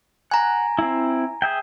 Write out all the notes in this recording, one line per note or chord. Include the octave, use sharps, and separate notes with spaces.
F#5 G#5 A#5
C4 E4
G#4 E5 G5